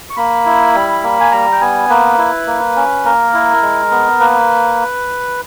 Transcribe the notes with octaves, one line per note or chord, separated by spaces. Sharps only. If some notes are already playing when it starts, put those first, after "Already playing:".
C#6
A#3 B5
E4
G3
A#3
G#5
G3 A#5
G5
B3 G#5
A#3 B4
E4
A#3
C#4
A#3 A#4
E4
G#3
B3
A#3 B4